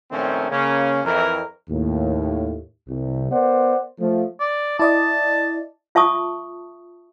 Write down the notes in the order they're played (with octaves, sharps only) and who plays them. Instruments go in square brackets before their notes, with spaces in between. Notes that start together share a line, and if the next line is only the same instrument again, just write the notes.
[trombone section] A#1 A#2 D#3 A3 C4 C#4
C#3 A#3 C#4
F2 E3 A#4
[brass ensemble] D#2 A2
C2
B3 A#4 C5 D5 F#5
F3 A3
[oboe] D5
[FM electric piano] E4 D5 D#5 [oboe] A5
[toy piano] F4 E5 A5 C#6 D#6